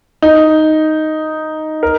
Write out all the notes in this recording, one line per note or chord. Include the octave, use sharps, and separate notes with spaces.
D#4
A#4